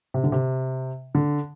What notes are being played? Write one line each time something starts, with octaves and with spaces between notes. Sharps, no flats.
C3
D3
C3
D3